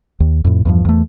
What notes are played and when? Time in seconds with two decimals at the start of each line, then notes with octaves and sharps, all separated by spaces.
0.20 D#2
0.45 F2 A2
0.65 E2 G2 F3
0.85 E2 A3